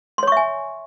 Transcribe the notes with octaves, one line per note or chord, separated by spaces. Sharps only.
C#5 E5 G#5 C6 C#6